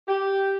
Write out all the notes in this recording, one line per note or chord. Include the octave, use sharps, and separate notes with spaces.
G4